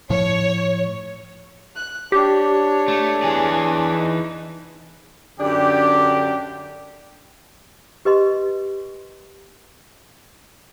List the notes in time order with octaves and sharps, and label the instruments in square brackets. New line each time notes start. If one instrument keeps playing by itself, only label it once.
[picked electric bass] A2 F3 [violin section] C#5
[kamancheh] F#6
[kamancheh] D4 C#5 [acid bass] G4
[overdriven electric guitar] A3
E3 G#4
[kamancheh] D#4
[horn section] F#2 D3 D4 G4
[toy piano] G4 B4 D#5 C6